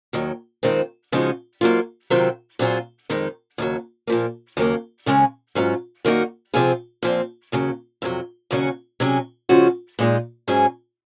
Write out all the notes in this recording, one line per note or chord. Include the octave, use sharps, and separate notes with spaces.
D#2 D#3 F#3
F2 D#3 G#3 C4 F4
C#3 F3 G#3 D#4 F#4
G#2 F#3 A#3 F4
C3 D#3 F#3 C4 F4
A#2 F#3 C4 F4 G#4
F2 D#3 G#3 D#4
D#2 C#3 F#3
A#2 F3 A#3
D#2 C#3 F#3 A#3
D#2 C#3 G#3 C#4
G#2 F#3 C#4 F4
F#2 D#3 A#3 D#4 F#4
C3 F3 C4 F4 G#4
A#2 F3 C4
D#2 C#3 F#3
F2 C3 F#3
D#2 C#3 F#3 C#4 F#4
C3 F#3 C#4 G#4
C#3 F3 G#3 C#4 F#4
A#2 G#3 D#4
G#2 F#3 C#4 G#4